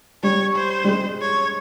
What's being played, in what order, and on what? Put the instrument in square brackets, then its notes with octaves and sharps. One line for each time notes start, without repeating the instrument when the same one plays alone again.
[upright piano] G3 [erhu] C#5
[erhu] C5
[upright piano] G3
G#3
[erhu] C#5